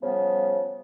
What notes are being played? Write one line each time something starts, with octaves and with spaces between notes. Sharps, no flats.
C#3 F3 G3 B3